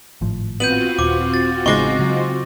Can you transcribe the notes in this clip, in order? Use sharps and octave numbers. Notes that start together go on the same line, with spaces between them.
G#1 A2 F3
B3 C4 F4 F#4 G6 D#7 F#7
D#1 D6
A6
A1 C#3 G#3 B3 D#4 C#6 D6 A#6
C#3 F#3